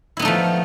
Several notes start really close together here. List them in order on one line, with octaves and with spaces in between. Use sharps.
E4 B3 D#4 A3 F3